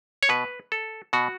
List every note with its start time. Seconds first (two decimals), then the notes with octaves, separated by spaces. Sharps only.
0.23 C#5
0.29 B2 B4
0.72 A4
1.13 B2 F#4